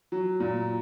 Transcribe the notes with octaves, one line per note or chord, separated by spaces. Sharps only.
F#3
A#2